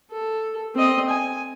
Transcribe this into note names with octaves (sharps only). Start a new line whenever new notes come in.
A4
C4 D#5
G#5